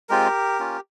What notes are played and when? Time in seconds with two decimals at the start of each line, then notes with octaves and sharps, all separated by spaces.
0.09 G#3 C4 F4 G4 A#4
0.60 A#3 C#4 F4